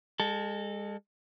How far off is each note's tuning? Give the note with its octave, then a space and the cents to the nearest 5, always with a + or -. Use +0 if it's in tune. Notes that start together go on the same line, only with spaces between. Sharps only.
G#3 -35 A4 +0